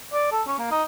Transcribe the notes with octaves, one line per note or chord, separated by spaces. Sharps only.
D5
A4
C#4
A#3
D#4